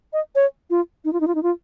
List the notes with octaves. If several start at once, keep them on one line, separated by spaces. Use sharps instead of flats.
D#5
C#5
F4
D#4
F4
D#4
F4
D#4
F4